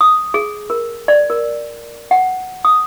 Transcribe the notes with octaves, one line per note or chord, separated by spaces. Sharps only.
D#6
G#4
A#4
D5
A#4
F#5
D#6